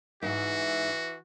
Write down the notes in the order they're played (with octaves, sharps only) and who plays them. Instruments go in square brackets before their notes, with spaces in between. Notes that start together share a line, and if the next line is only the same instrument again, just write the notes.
[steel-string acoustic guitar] G#2 E5 [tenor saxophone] E3 [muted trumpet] F#4